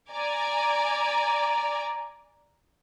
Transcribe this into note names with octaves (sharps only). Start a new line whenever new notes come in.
D5 G#5 A#5